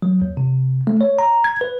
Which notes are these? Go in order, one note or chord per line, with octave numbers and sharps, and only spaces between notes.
F#3
D#2
C3
A3
C#5
A#5
G#6
B4